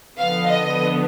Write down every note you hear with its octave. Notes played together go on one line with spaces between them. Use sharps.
D3 F3 B3 F5
D#5